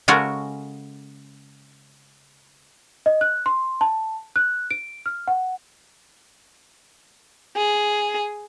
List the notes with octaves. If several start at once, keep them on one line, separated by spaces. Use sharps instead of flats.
C#3 G#3 C#4 F#4 A4 A#4
D#5
F#6
C6
A5
F#6
D7
F6
F#5
G#4